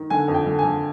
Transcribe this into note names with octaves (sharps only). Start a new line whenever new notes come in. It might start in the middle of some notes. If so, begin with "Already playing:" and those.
Already playing: D#3
D3 G#5
F2
G5
D3
G#5
D3